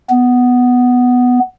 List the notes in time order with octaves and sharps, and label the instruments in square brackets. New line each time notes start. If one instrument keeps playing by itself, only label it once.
[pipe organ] B3